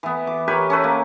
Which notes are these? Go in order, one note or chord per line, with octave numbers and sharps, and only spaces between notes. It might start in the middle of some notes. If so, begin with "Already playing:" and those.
E3 B3
D6
G4 A#4 B4 C#5
C#4 A4 B4
A#3